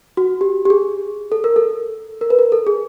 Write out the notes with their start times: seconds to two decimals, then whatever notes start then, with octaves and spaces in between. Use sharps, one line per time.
0.17 F#4
0.41 G4
0.65 G4
0.70 G#4
1.32 A4
1.44 A#4
1.56 A4
2.21 A#4
2.30 B4
2.39 A#4
2.52 A4
2.67 G#4